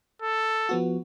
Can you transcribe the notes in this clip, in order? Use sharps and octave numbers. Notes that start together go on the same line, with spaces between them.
A4
F3 B3 F#4